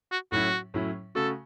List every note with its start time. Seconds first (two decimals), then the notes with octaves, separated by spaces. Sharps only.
0.12 F#4
0.32 A2 F#3 C#4 E4 F#4
0.74 A2 F#3 C#4 E4
1.15 C#3 A3 F#4 A4